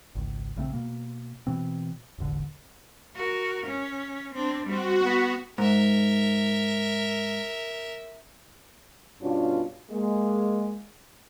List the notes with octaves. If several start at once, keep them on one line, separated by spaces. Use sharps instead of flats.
G#1 C#2
A#1 C#3 A3 C4
B2 A#3
B2 E3 C4
E1 A1 D3
F#4 A#4
C#4
C4 D4
G3 C4 F#4
B3
G#2 A#4 E5
G2 B2 C#4 D4 F4
G#3 A#3